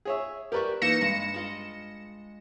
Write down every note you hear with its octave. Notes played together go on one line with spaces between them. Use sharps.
G#4 C#5 E5
G4 A#4 B4 D5 E5 C#6
E3 A#3 D#4 A#6 C#7 E7
G2 G#3
G#3 F4 D#5